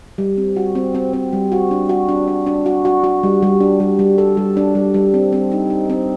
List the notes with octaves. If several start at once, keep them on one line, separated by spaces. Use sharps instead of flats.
G3
C4
F#4
C4
C4
C4
G3
F#4
D4
F#4
D4
D4
D4
F#4
F#4
F#4
G3
G3
D4
G3
G3
A4
G3
D4
G3
G3
C4
C4
D#4
D#4
C4